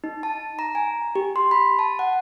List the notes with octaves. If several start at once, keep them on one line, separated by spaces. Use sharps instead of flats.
D#4
A5
A#5
G#5
G4
C6
B5
A5
F#5